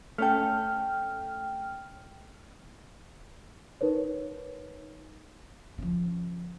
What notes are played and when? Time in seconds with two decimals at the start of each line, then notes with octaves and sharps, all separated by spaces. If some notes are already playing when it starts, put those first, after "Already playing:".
0.18 A3 C#4 A4 G5 F6
3.81 D#4 A#4 B4 C#5
5.78 C#3 F3